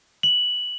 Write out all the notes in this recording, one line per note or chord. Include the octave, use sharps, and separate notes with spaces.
F#7